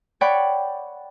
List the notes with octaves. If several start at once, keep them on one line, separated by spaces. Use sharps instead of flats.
C#5 D5 F#5 G5 B5